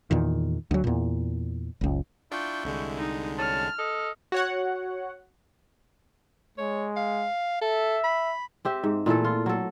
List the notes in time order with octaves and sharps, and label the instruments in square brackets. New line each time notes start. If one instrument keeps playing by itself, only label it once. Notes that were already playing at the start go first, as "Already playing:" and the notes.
[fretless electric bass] E2 A#2 D#3
D2 F#3
E2 A#2
F#1 C#2
[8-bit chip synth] D4 F4 G5 [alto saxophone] E4 [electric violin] C#6 G6
[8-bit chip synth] C2 D3 G#3
[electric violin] D#4
[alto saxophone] C#4 [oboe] A5 [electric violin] F6
[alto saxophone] A4 [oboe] D#5
[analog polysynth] F#4 C#5 F#5
[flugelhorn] G#3 [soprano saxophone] C#5
[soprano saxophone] F5
[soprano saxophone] A4 [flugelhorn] E5
[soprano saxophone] B5
[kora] C4 G4 E5
G#2
A#2 E3 A3 A4
F4
F#3 A4